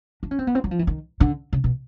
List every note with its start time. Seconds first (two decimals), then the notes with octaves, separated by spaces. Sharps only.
0.23 D4
0.31 C#4
0.39 C4
0.47 B3
0.55 C4
0.64 F#3
0.71 F3
0.79 E3
0.87 D#3
1.20 D3
1.53 C#3
1.64 B2